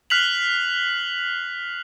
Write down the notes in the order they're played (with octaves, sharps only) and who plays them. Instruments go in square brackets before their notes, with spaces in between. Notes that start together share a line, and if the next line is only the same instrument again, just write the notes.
[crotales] F6 F#6 B6 C7 F7 F#7